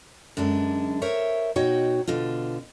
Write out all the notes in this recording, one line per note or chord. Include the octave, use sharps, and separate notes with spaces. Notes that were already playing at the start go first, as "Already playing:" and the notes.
F#2 D3 G#3 D4
A#4 C5 C#5 E5
B2 D#4 F#4 C#5 G5
B2 D3 F4